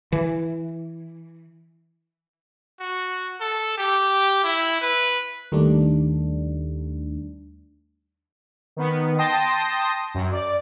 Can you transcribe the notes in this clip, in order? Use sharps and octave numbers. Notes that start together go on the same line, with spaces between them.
E3
F#4
A4
G4
E4
B4
D#2 D#3 G3 A3 D4
D#3 B3
G5 A5 C6 D#6 A#6
F#2
D5